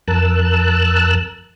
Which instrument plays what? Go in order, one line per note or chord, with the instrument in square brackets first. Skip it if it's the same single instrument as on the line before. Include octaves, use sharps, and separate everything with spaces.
[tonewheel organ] F2 A#4 A5 E6 F#6